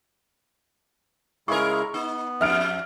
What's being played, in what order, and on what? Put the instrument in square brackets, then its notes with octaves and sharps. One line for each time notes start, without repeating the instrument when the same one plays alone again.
[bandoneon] C#3 G#3 E4 [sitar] G#4 A#4 [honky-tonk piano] C#6
[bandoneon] B3 [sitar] D#4
[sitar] F2 [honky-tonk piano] E5 F6 D7